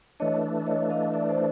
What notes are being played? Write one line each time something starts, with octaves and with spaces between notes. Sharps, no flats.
E3 A3 D4 C#5 D#5
C#5 D#5
D#5 F5
D5 E5
C5 D5